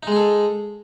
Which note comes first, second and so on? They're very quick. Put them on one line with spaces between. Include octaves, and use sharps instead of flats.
D#4 G#3 G#4 A4